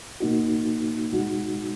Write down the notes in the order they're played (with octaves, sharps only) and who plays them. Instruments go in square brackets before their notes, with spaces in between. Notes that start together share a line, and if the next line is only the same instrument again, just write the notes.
[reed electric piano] B2 A#3 D#4 F#4
B2 G#3 D#4 F#4